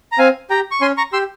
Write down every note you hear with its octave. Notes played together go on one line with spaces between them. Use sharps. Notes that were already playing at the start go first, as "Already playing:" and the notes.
A#5
C4 F5 G#5
G4 G5 A#5
C#6
C#4 G#5 C6
A#5 C#6
G4 C6 E6